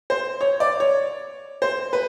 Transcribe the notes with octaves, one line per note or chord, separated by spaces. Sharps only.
C5
C#5
D5
C#5
C5
B4